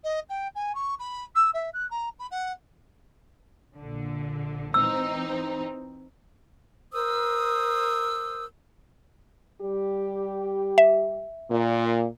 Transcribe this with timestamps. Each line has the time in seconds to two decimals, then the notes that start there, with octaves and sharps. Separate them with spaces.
0.04 D#5
0.29 G5
0.55 G#5
0.75 C#6
0.99 B5
1.35 E6
1.53 E5
1.73 F#6
1.90 A#5
2.19 B5
2.31 F#5
3.78 A#1 D3
4.74 E3 C4 D#4 E6
6.94 A#4 C5 D#6 E6
9.62 G3 G4
10.78 E5
11.51 A#2